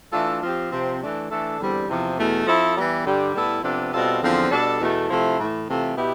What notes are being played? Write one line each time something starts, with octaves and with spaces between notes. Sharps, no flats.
E3 A3 D4 F4 A4
F3 C4 G4
C3 F3 C4
E3 A3 D4
E3 A3 D4 A4
E2 D3 G3 C4
E2 C3 F3
E2 B2 A3
F3 C4 E4 A4
E3 G3 B3
G2 D3 G3
A2 G3 B3 E4 A4
C3 F3 B3 D4 A4
B2 G3 C4 F4 A4
E2 D3 F3 C4 F4
B2 G3 D4 A4
E2 B2 A3
C3 F3 A3 E4
A2 E3 A3
C3 E3 A3 C4 F4
B2 B3 E4 G4